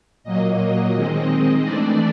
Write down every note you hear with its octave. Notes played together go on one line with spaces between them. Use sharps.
A#2 F#3 A#3 D#5
D#3 G#3 C4
E3 A3 D4 D5